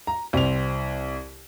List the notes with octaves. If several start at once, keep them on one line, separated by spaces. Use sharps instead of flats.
A#5
C2 C4 F7